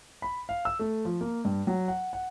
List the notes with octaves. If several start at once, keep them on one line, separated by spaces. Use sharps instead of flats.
B5
F5
E6
A3
F3
A#3
G2
F#3
F#5
F#5